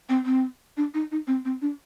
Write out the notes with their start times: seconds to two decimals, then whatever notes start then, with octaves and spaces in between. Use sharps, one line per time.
0.09 C4
0.26 C4
0.77 D4
0.94 D#4
1.12 D#4
1.27 C4
1.45 C4
1.62 D4